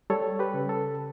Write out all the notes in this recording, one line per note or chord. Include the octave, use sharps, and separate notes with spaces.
G3 A4 C#5
G4 B4
C#3
A4